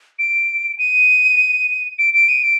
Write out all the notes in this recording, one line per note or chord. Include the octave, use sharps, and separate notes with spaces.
D7
D#7
D7
D7
D#7
D7